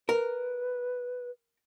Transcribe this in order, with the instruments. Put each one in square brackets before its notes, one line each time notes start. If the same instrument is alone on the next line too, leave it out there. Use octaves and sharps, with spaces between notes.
[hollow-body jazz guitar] A#4 [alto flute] B4